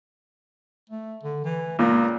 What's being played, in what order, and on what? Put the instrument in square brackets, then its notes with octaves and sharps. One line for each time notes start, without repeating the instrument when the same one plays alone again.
[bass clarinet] A3
D3
E3
[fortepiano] C#2 A#2 [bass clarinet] A#3